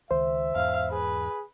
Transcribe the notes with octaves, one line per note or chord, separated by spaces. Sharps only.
C#2 D#3 C5 E5
E2 G#2 F5
G#4 B4